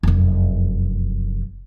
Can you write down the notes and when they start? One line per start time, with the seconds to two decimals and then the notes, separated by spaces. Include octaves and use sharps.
0.03 F1 F#2